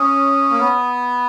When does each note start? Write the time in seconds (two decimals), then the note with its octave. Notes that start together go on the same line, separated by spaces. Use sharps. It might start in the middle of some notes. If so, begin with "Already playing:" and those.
Already playing: C#4 D#6
0.50 A#3
0.60 B3